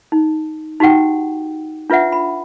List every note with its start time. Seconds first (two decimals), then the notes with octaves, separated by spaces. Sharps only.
0.12 D#4
0.80 D#4 F#4 G4 F#5 G5
1.90 D4 F4 B4 E5 F#5
2.12 B5